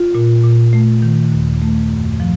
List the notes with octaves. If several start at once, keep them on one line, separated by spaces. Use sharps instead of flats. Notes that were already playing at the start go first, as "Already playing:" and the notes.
Already playing: F4
A#2
A#2
A3
D#3
D#2
A3
F#2
F3